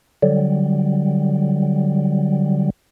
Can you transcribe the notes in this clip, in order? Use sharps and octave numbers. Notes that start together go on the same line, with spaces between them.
D3 F#3 G3